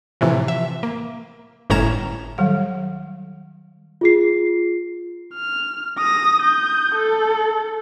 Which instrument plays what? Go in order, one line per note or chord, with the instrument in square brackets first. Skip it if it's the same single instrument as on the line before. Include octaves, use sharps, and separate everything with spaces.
[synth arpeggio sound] A2 C3 E3 F3
E5
A#3
G1 A2 C#4 A#5 G#6 E7
[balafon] D#3 F#3 G3 A4 F#5
[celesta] F4 G#4 C7
[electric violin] F6
D#6 A#6
D#6 G6
A4